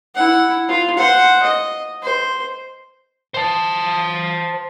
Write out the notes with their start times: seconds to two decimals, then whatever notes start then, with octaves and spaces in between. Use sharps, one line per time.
0.15 E4 F#5
0.68 F4
0.97 C5 F#5
1.43 D#5
2.02 C5
3.34 C5 A5